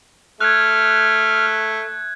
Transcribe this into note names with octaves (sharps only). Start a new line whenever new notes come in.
A3 F6 F#6 G#6